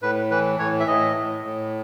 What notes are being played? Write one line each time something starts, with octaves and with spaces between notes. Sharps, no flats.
A2 B4
E3 B4
A2 C#5
E5
A2 D#5
A2
A2